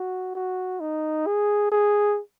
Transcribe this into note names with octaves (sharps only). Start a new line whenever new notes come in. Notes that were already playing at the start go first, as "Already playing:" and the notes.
Already playing: F#4
F#4
D#4
G#4
G#4